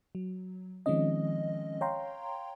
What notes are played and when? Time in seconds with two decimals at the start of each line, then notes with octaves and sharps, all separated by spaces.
0.15 F#3
0.86 D#3 F3 G#3 C4 C#4 D#5
1.81 C#5 F5 G5 A#5 C6